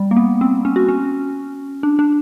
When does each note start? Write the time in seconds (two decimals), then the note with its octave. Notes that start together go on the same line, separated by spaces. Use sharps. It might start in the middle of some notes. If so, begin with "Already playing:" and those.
Already playing: G3
0.11 A#3
0.17 B3
0.41 C4
0.65 C#4
0.76 F#4
0.89 C#4
1.83 D4
1.99 D4